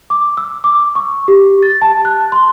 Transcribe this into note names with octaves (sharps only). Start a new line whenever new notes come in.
D6
E6
D6
C#6
G4
A6
A5
F#6
C6